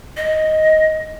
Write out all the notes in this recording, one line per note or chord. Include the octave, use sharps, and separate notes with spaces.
D#5